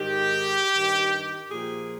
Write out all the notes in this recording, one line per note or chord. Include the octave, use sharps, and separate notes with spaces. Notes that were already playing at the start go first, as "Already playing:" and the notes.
Already playing: G#2 D#3 G4
G2
D#3
A#2 F3 G#4